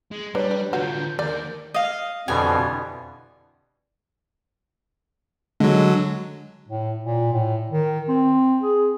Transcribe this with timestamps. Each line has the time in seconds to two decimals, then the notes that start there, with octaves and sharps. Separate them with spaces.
0.12 G#3
0.35 G3 D4 B4 C#5
0.51 D4 D5
0.73 D3 F4 F#4 C#5 G6
1.19 D#2 A#3 A#4 D5
1.74 D#5 F5
2.28 F2 B2 D3 E3 G3 G#5
5.60 D3 F#3 G#3
6.69 A2
7.04 A#2
7.33 A2
7.70 D#3
8.08 C4
8.62 G#4